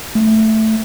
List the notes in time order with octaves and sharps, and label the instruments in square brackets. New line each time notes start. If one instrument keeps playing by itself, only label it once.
[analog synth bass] A3